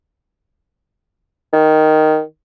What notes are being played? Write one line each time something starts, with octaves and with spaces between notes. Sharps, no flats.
D#3